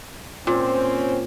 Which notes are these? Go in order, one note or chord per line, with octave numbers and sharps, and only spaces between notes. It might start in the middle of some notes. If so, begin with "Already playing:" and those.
A#2 C4 C#4 C5